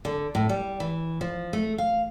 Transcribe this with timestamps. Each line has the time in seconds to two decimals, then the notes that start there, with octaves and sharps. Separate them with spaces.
0.05 D3
0.35 A2
0.49 G3
0.80 E3
1.21 F3
1.53 A3
1.78 F5